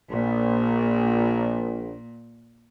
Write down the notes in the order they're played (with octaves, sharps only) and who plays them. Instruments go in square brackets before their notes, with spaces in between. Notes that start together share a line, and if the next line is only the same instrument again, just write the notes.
[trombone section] A#1 [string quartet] A#2